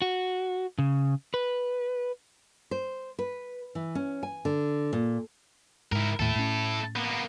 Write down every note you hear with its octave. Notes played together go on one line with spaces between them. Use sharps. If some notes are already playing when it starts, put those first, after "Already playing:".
F#4
C#3
B4
C5
B4
E3
C#4
G#5
D3
A#2
G#2 E4 A#4
D#2 A2 E4 A4
A2 C#4
A#3 B3